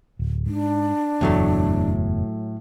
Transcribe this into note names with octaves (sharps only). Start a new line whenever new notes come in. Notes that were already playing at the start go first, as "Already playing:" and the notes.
D1
G#2 D4
F#1 E2 A2 F#3 A3